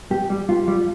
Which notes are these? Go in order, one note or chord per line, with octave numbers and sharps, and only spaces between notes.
G2 G4
G3
G2 F4
G3